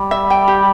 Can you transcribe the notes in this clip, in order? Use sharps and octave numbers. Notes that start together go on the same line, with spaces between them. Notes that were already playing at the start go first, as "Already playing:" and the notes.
Already playing: G3
E5
G5
G4